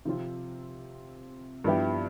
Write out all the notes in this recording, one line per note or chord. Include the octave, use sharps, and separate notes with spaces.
C3 F3 C4 F4
G2 F3 B3 E4 G4